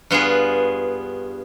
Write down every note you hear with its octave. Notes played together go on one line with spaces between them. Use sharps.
G2 B3 F4 G#4